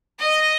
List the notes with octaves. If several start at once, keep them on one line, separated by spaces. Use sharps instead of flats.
D#5